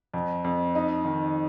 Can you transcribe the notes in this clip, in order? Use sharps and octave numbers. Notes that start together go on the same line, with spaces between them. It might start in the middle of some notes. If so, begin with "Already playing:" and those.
F2
F2
D#4
D#3